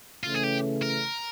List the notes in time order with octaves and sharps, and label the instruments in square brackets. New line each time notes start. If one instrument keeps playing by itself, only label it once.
[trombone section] C#3 E3 A3 C#4 [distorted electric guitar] F4
[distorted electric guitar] G#4
G4
A#4